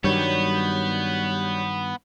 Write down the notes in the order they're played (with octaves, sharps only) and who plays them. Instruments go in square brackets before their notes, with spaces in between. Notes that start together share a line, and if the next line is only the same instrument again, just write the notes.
[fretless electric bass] G2 D#3 F#3 [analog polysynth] G3 C#5 G6 [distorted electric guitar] B3